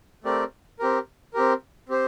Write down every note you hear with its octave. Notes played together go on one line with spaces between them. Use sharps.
A3 C4 G4 A#4 D5
C4 G4 A#4
C4 G4 A#4
C4 G4 C5